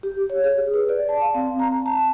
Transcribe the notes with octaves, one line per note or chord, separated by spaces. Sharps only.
G4
C#5
G#4
B4
D5
A5
F5
C4
A#5
A5